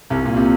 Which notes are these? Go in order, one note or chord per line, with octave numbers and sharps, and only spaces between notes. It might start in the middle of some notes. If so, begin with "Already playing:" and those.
C2 C3
A#2
C3